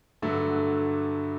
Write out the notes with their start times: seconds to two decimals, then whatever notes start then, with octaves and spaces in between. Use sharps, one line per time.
0.22 G2 D3 F#3 A3